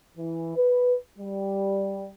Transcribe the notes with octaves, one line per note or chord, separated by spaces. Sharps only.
E3
B4
G3